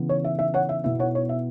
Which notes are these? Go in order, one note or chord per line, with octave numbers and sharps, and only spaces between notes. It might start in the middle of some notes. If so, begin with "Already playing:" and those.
Already playing: C#3 E3 B3 E4
C#5
E5
E5
C#5 F#5
E5
B2 B3 E4 E5
C#5 F#5
C#5
E5